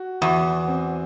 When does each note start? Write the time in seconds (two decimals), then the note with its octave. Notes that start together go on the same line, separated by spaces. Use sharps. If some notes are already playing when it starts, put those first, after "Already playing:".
Already playing: F#4
0.21 E2 F#4
0.68 C4